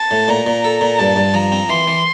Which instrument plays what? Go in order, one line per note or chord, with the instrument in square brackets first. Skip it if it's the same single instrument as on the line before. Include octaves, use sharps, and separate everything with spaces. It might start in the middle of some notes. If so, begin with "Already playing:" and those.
Already playing: [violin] A5
[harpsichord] A2
[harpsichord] A#2 [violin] A#5
[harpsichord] A#2
A4
A#2
[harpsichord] G2 [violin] A5
[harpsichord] G2
[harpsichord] F3 [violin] A#5
[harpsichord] C4
[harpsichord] E3 [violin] C6
[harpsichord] E3